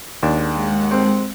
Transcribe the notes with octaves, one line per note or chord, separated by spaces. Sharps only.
D#2 G#3 D4 F#5
C4